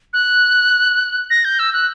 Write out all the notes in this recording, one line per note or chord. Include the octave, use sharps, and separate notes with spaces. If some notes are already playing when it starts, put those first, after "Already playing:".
F#6
A#6
G6
E6
F#6